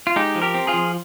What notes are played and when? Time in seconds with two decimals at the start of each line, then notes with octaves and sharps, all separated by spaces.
0.07 F4
0.16 G#3 D#4 G4
0.35 F3
0.42 G4 A#4
0.54 C4
0.67 F4 G#4
0.74 F3